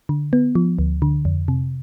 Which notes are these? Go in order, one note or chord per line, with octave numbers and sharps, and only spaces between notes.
D3
B3
F3
D2
D3
F2
C3